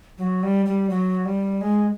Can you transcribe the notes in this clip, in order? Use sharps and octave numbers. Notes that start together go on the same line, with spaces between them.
F#3
G3
G3
F#3
G3
G#3